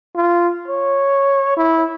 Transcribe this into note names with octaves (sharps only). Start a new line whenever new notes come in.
F4
C#5
E4